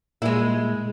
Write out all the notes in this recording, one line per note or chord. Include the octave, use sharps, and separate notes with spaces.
A#2 G#3 E4